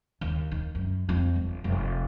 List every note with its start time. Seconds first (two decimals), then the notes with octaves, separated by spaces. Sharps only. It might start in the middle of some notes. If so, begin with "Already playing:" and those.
0.21 D#2
0.52 D#3
0.75 F#2
1.09 F2
1.36 G1
1.64 F1